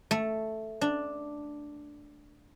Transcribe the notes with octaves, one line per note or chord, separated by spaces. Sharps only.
A3
D4